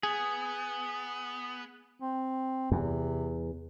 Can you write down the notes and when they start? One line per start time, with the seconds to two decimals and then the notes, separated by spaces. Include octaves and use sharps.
0.03 B3 G#4
2.01 C4
2.72 E2 C3